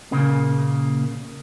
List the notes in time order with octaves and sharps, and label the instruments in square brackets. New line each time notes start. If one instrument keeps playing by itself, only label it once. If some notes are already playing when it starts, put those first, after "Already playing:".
[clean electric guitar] A#2 C#3 A#3